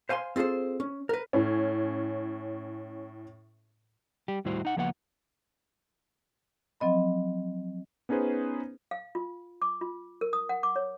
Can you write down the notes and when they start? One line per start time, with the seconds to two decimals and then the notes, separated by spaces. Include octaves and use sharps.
0.09 C5 F5 G#5 A5 C6
0.36 C4 F4 G#4 A4 C5
0.80 C#4
1.09 A#4 B4
1.33 A2 C#4
4.28 G3 G4
4.45 D#2 A2 G3 E4 F#4 C5
4.65 D#4 F#5
4.76 C#2 F3 A#3 B3 C#5 F#5
6.80 F3 F#3 C4 D#5 B5
8.09 B3 C#4 D#4 G#4 B4 C5
8.91 F5
9.15 F4
9.62 D6
9.81 F4
10.21 A#4
10.33 D#6
10.49 F#5
10.63 D6
10.76 C#5